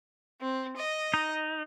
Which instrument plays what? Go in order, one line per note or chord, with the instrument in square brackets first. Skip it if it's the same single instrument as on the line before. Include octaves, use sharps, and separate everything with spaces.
[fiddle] C4
D#5
[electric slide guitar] D#4